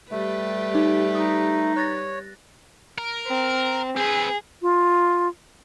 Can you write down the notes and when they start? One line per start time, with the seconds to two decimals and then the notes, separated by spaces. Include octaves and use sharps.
0.11 G3 A3 G4 B4
0.75 D#4
1.15 D#4 D#6
1.76 C#5 F#6 A6 A#6
2.98 A#4
3.27 C4
3.97 C4 G#4 B4
4.62 F4